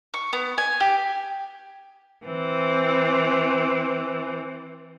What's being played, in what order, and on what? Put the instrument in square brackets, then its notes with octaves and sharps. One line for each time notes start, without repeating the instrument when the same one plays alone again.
[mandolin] C#6
B3
G#5
G4
[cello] E3 C4